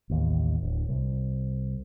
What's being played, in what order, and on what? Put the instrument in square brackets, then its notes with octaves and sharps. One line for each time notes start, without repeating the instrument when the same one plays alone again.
[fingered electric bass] A1 D#2
D1
C2